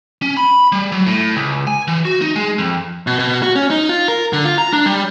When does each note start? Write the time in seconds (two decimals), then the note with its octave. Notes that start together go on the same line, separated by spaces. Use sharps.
0.22 C#4
0.37 B5
0.72 G3
0.92 F#3
1.06 A2
1.36 C#2
1.67 G#5
1.88 E3
2.05 F#4
2.22 D#4
2.36 G#3
2.58 F2
3.07 B2
3.19 B2
3.43 F#4
3.56 C#4
3.71 D#4
3.89 F4
4.08 A#4
4.33 D3
4.44 F4
4.58 A#5
4.73 D4
4.86 G3